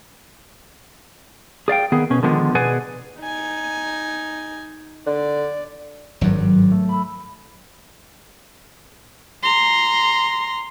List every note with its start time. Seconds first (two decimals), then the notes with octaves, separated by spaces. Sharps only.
1.68 G#4 D5 F5 G5
1.92 D#3 B3 G#4
2.10 B2 C#4
2.23 D3 D#3 F3 G#3 B3
2.55 B2 G#4 B4 D5 F#5 G#5
3.20 D#4 G#5
5.07 D3 D5
6.21 G#1 G2 F#3
6.35 G6
6.71 A3
6.89 B5 E6
9.43 A#5 C6